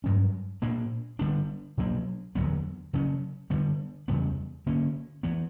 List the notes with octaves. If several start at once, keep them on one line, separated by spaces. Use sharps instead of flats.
G2 F#3 C#4
A#2 A#3 D4
D3 G3 B3 D4
B2 F#3 A#3 D4
E2 D3 F#3 B3
C#3 F#3 C#4
D3 G3 B3
E2 C#3 G3 B3
D3 A#3 C#4
E3 B3